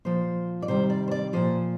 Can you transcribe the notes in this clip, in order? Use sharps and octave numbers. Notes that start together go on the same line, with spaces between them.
A#2 F3 C5
D5
C3 D#3 G3 C5
D5
C5
D5
A#2 F3 C5